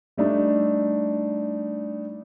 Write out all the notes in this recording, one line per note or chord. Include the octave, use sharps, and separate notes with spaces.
G3 A3 D4 D#4